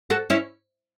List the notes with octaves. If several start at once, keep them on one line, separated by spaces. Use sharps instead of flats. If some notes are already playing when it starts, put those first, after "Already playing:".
F#4 A4
C#4 E4